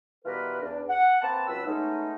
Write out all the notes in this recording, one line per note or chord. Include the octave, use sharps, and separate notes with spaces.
B2 E3 G3 F4 A#4 B4
E2 D4
F#5
A#3 C4 B4 G5 A5
C#2 F#3 B4 E6
G#3 A3 B3 C#4 D#4